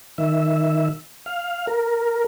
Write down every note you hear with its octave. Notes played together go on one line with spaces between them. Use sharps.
D#3 E5
F5
A#4